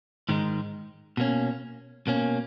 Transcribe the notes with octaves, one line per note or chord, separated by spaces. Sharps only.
G#2 D#3 G#3 D#4
B2 A#3 C#4
B2 A#3 C#4